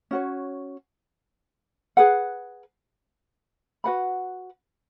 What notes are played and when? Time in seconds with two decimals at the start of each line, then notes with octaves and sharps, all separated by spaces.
0.11 C#4 F#4 C#5
1.97 G#4 B4 F#5
3.84 F#4 B4 F#5 B5